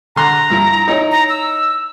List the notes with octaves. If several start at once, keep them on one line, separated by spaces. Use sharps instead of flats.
D3 A#5 C6 F#6
G2 F3 E4
D#4 E4 C#5
A#5
E6